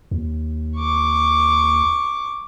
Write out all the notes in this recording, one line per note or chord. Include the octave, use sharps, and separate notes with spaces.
D#2
C#6 D6